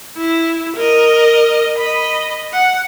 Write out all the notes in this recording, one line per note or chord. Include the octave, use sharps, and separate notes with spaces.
E4
A#4 D#5
D#5 B5
F#5